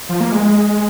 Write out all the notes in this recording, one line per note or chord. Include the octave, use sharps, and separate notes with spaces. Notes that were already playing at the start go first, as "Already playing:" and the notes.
F3
A#3
G#3